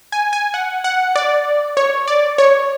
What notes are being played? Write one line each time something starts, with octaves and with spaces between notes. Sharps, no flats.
G#5
G#5
F#5
F#5
D5
C#5
D5
C#5